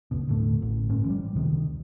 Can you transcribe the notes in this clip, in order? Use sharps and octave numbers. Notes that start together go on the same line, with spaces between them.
F#1 C#2 B2
D#2 A2 D3 A3
A1
G1 A2 C#4
E3 G3
F1 C#2 C3 D#3